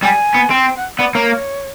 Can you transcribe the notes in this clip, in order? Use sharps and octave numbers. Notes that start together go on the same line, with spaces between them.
G3 G#5
B3
C4
G5
F#5
B3 D5
A#3 C#5